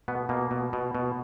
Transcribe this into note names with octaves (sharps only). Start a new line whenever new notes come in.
B2 B3
B2 A#3
B2
B2
B2